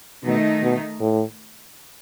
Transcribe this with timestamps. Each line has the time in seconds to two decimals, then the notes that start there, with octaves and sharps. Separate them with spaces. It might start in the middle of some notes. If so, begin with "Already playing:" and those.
0.24 B2 D#3 A3 D#4
0.62 B2
1.00 A2